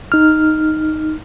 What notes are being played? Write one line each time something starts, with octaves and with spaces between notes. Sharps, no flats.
D#4 F6